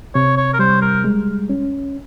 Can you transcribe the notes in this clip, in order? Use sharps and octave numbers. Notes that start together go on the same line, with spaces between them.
C3 C#5
C#5
A#4
G3 C5
A#4
G#3
C#4